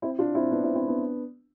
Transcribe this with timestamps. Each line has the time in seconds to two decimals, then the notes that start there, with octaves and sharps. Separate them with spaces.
0.02 C4 E4
0.19 D4 F4
0.35 C4 E4
0.51 B3 D4
0.64 C4 E4
0.75 C4 E4
0.88 B3 D4